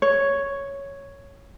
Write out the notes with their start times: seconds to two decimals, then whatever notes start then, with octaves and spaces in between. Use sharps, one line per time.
0.02 C#5